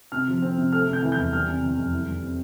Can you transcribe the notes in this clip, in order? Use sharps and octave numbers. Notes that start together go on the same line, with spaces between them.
C3 F6
F3
C4
C3
A3 F6
C3
G6
E3
G6
E2
G3 F6
C3
E3
F2
E4
G3
C4